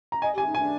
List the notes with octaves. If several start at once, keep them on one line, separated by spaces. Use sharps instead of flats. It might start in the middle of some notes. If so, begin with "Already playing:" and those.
A#5
D#5 G#5
G4 G#5
D#4
G#5
D4